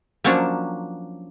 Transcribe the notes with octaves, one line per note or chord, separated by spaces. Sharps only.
F3 F#3 A#3 C#4 D4